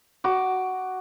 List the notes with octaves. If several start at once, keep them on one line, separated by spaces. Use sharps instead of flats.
F#4 D6